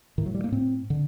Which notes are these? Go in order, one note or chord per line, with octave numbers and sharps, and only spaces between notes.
A2 D#3
F#3
G3
A#3
A2 C4
D3